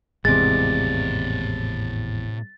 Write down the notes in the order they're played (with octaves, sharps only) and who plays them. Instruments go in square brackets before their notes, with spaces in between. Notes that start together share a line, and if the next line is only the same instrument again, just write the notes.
[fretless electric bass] G#1 E2 [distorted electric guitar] A2 D5 [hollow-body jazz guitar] C3 G#3 [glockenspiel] A6